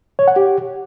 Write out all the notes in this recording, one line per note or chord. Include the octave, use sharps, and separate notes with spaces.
C#5
F#5
G4